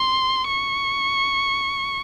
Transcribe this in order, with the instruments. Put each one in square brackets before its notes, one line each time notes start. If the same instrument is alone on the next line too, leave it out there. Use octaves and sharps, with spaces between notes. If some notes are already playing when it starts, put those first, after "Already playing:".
Already playing: [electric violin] C6
C#6